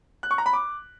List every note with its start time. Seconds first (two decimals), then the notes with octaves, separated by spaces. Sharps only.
0.23 F#6
0.31 C#6
0.38 A#5
0.46 B5
0.53 D6